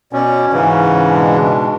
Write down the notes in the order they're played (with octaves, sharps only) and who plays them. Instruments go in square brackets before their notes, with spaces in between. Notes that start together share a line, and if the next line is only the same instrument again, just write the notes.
[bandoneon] B2 C#4 [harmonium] D5
[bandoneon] G#2 C#3 E3 [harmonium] C#4
[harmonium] B2 G#3 D4